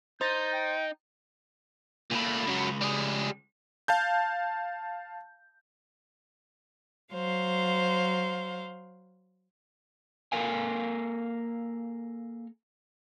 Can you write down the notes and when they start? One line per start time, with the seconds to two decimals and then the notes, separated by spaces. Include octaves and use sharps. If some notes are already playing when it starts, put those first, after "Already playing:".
0.21 D#4 C5 G6 A6 A#6
0.53 G5
2.11 C#2 A#2 A3 B5
2.47 F#2 F#3
2.81 G3 G#4
3.88 F5 A5 G6
7.12 F#3 C5 F5
10.32 A#3 A4 A#4 F5 G#5